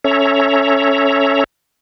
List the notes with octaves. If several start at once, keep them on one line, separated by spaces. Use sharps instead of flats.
C#4 A4 C#5 E5 A#5